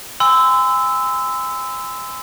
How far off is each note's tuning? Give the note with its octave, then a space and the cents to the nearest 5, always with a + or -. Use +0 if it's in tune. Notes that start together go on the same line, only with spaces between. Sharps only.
G#5 -35 C6 -40 E6 -10